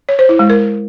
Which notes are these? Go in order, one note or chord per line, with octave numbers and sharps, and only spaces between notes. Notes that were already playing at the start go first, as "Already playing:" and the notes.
C#5
C5
E4
G#3
A#4